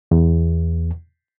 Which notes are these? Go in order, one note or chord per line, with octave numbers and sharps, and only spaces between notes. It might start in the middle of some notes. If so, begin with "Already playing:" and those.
E2